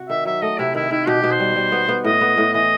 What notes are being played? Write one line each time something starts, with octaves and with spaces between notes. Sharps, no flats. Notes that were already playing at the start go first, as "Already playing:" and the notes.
Already playing: C3 F#4
D#3 E5
F#3 E5
A3 D#5
C3 E4
D#3 E4
D#3 E4
B2 G4
B2
C5
G3
G3
B3
B3
A2 D#5
B3
A2
E3 D#5